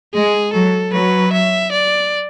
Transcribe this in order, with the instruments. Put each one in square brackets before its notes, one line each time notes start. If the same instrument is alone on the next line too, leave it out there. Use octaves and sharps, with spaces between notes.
[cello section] G#3 [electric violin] G#4
[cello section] F#3 [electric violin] A4
[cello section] F#3 [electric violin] B4
[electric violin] E5
D5